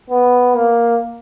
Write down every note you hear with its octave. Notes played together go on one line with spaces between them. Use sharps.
B3
A#3